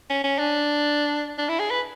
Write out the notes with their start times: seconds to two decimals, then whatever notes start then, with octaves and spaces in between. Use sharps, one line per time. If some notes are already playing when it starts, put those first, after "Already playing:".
0.10 C#4
0.24 C#4
0.38 D4
1.38 D4
1.49 E4
1.59 G#4
1.70 B4